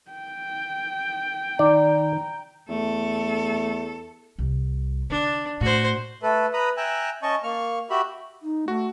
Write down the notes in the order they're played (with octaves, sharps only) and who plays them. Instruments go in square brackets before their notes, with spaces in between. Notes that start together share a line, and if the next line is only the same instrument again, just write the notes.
[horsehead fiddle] G5
[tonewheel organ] D#3 [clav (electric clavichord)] D5 [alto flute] A#5
[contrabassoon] E2 [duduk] A3 [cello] A4
[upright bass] C2
[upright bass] D3 [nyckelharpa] D4
[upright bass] A2 [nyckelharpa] F#4 C5
[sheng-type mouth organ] A3 A4 B4
B4 A#5 B5 D#6
E5 G5 G#5 A#5 E6 F#6
C#4 D#5 A5 C#6
A#3 C#6 F6
F#4 G4 E5 B5
[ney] D#4
[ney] A3 [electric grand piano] F#4